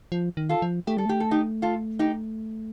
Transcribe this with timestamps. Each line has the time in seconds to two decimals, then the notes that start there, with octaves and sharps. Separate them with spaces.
0.12 F3
0.37 D#3
0.49 F4 A4
0.62 F3
0.87 A3 G4
0.97 G3 A4
1.06 A3 G4
1.20 A4
1.31 D#4 G4
1.62 F4 A4
1.99 D#4 G4